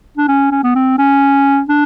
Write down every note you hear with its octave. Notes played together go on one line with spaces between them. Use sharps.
D4
C#4
C#4
B3
C4
C#4
D4